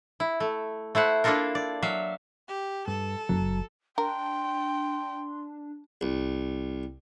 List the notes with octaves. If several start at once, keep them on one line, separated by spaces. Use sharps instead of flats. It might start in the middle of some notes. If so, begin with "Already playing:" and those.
E4
A3
A3 E4 C5 F#5
A#3 D4 E4 F4 A4 A#4
D5
F#3 E5 F5
G4
G2 A4
F#1 F#3
D4 A#4 G5 C6
C2